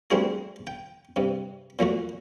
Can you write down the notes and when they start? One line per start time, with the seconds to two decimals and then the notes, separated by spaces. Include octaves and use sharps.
0.11 G3 A3 C4 D4 F#4 G#4
0.67 G5
1.16 G2 C3
1.79 A#2 F#3 A3 F#4